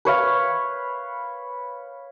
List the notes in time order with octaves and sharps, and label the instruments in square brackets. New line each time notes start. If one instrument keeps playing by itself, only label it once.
[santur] B4 C#5 F5